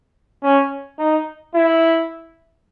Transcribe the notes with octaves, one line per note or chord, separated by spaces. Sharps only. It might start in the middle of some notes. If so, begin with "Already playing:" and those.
C#4
D#4
E4